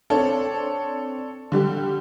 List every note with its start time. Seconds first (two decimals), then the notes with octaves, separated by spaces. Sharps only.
0.10 C4 D4 A4 C#5
1.52 D3 G3 G4